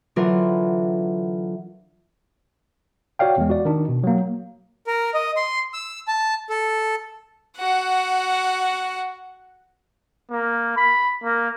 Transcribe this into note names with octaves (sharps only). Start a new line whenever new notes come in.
D3 E3 F#3 D4 F4 A#4
F#4 C#5 D5 F5 G5
E2 G#3
F#4 D5
D#3 D4
B2
F#3 A#3
A#4
D#5
C6
E6
A5
A4
F#4 F#5
A#3
B5
A#3